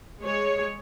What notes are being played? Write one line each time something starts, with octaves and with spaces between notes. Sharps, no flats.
G#3 G#4 C#5